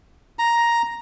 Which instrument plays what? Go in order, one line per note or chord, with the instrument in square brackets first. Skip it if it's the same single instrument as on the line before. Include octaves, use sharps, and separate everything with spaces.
[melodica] A#5